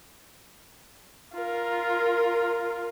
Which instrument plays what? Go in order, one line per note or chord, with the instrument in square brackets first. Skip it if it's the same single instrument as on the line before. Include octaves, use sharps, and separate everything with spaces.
[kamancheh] F4 A#4